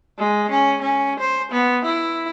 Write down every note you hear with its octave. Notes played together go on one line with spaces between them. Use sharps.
G#3
C#4
C#4
C5
B3
E4